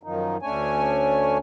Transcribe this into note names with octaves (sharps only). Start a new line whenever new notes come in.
F#2 D#3 F3 D#4
D2 A3 C#4 D4 C#5 G#5